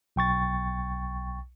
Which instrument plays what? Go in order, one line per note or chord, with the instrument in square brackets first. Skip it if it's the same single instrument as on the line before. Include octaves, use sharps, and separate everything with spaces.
[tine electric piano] B1 G5 C#6 A6